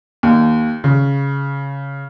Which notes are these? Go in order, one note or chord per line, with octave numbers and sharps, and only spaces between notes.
D#2
C#3